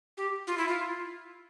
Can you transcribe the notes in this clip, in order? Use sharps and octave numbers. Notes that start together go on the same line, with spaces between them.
G4
F4
E4
F4